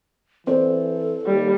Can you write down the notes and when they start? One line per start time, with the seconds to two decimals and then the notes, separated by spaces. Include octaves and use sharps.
0.47 E3 C4 A4 C5 D5
1.26 D#2 G3